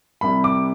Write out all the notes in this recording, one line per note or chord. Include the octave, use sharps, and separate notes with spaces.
C2 C3 G3 B5
D6